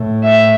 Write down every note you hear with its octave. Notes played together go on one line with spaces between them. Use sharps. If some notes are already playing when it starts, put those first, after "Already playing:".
Already playing: A2
E5